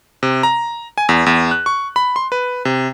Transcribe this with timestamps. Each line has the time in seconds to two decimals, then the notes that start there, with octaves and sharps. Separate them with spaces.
0.23 C3
0.43 A#5
0.98 G#5
1.09 E2
1.26 E2
1.51 F#6
1.66 C#6
1.96 B5
2.16 C6
2.32 B4
2.65 C3